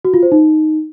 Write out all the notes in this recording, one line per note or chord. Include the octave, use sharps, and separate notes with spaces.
F#4
F4
C5
D#4